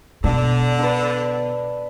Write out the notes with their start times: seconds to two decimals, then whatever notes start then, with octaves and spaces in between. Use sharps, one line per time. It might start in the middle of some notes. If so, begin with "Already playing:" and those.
0.24 B2 D3 D4
0.79 D4 B4